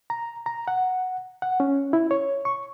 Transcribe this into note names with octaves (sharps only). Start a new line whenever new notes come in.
A#5
A#5
F#5
F#5
C#4
E4
C#5
C#6